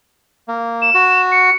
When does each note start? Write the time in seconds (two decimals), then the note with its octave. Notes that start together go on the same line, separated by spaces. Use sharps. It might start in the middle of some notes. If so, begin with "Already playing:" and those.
0.48 A#3
0.82 E7
0.94 F#4
1.32 C#7